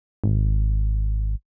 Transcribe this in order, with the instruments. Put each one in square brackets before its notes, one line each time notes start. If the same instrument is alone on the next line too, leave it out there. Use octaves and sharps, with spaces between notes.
[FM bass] G#1